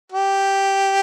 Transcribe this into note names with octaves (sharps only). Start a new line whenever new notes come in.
G4